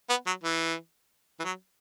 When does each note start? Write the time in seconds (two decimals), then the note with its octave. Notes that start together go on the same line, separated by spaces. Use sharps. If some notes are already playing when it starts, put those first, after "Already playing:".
0.10 B3
0.27 F#3
0.44 E3
1.40 E3
1.44 F#3